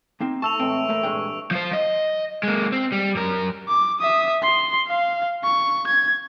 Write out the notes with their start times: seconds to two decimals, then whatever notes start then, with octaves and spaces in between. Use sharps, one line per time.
0.20 A#3 C4 D#4
0.42 A3 A5 C#6 E6 F7
0.60 A2 E3 G#3 C4 D7
0.89 A3 A#3
1.03 G2 A#2 G#3 E5 G5 C#6
1.51 F3 C5
1.73 D#5
2.43 G#3 A#3
2.72 C4
2.92 G3
3.15 F#2 A#4
3.68 D6
4.00 E5 D#6
4.43 C6
4.87 F5
5.44 C#6
5.87 G#6